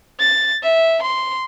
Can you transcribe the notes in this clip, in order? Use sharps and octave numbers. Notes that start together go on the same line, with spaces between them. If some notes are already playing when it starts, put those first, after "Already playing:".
A6
E5
C6